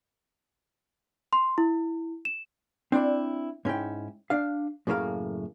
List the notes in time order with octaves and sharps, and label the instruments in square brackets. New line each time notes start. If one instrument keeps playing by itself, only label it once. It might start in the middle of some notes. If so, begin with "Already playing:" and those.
[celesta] C6
E4
E7
[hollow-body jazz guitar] C4 D4 E4 D5
G#2 C#4 E4 G5
D4 F5
F#2 A2 C#3 A#3 F5